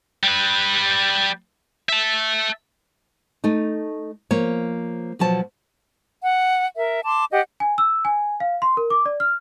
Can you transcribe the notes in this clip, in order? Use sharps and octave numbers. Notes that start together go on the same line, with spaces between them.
G3 B4
E5 A5
A3 D#4
F3 A#3 C#5
B2 F3 F#3 A5
F#5
A#4 E5
A5 C6 D6
G4 D#5 F#5
G#5
E6
G#5
F5
C6
A#4
D6
D5
F6